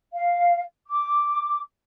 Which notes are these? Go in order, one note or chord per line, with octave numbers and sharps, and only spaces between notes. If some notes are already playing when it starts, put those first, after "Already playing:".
F5
D6